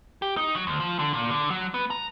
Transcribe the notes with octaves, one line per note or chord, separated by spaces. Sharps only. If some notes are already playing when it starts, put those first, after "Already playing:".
G4
D#4
F#3
D2
F3
D3
A#2
D3
F#3
B3
A#5